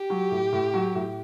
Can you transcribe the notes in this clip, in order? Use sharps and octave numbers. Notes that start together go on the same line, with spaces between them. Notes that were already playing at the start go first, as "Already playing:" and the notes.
Already playing: G4
F#3
A2
A2
F#3
A2